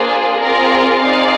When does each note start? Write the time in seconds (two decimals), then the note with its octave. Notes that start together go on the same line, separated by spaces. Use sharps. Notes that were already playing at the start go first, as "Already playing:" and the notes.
Already playing: A#3 D4 F4 G#4 C5
0.39 C4 F4 G#4 A#4 D5
1.01 C4 D#4 G#4 D5 F5